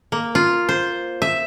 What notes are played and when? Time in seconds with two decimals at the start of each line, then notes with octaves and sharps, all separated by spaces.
0.12 A#3
0.35 F4
0.69 C5
1.22 E5